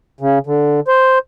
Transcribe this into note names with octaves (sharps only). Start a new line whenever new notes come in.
C#3
D3
C5